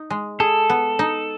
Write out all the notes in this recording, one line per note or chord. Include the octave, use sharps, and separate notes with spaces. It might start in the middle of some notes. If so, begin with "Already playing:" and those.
Already playing: D#4
G#3
G#4 A4
B3
D#4